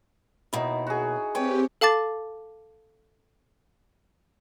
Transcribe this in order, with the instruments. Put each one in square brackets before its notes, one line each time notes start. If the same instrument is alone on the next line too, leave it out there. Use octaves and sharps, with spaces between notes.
[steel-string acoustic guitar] D#2 B2 [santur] D#4 E4
[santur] F#4 G#4
[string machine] C4 G4 [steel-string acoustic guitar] B4 G5 [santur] C#5
[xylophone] A4 F5 A5 D6 A6